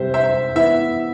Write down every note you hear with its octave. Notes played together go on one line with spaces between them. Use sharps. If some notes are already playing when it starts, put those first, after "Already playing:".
Already playing: C3 G3 C4 C5 E5
C5 E5
E3 B3 E5